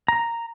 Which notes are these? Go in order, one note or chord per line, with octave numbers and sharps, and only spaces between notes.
A#5